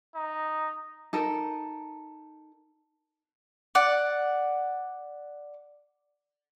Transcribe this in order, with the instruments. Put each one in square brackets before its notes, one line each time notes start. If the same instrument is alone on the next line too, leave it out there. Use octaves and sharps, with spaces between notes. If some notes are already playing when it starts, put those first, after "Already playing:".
[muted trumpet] D#4
[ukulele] D#4 A4 A#4
[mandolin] D5 F#5